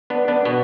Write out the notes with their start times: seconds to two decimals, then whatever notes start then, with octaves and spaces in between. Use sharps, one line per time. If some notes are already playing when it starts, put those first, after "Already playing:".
0.10 B3 D4
0.28 B3 D4
0.45 B2 B3